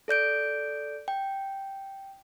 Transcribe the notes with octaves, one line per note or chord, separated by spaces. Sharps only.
A4 D5 G6 D7
G5